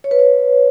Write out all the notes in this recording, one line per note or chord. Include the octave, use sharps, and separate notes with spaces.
C#5
B4
C#5